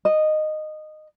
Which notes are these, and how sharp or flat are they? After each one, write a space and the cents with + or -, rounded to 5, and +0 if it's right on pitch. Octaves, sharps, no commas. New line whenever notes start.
D#5 -15